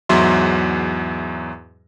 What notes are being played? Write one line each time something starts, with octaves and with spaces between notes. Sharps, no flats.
E2 G#2 F#3 E5 C6